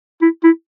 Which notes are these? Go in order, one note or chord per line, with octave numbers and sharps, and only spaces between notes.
E4
E4